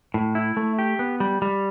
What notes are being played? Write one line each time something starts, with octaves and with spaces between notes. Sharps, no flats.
A2
E4
A3
G4
B3
G3
G3